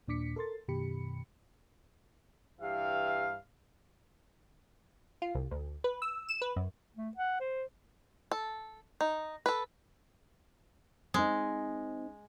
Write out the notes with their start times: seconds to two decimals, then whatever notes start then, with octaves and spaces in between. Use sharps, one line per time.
0.08 D#2 A#2 D4 D6 B6 C#7
0.36 A4 A#4 C6 A6
0.68 F#2 B2 D#3 G4 B5 C#7
2.60 G2 E3 G4 E5 F5
5.22 F4
5.35 C2
5.51 D2
5.84 B4
6.02 E6
6.29 E7
6.42 B4
6.56 F#2
6.96 A3
7.17 F#5
7.40 C5
8.31 A4
9.01 D#4
9.46 A4 B4
11.14 G#3 C4 D#4